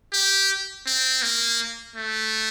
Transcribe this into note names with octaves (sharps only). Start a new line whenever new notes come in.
G4
C4
A#3
A3